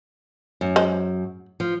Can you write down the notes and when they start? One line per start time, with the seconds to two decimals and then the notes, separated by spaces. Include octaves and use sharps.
0.61 F#2
0.76 G#3 C5
1.60 F3